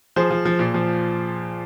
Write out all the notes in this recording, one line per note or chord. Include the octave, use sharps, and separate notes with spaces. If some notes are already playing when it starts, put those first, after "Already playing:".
F3 G#4 C5
F3
F3
A#2
F3